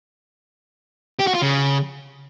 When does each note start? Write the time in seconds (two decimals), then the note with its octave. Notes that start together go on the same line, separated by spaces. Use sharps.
1.19 G4
1.27 F#4
1.34 F4
1.42 C#3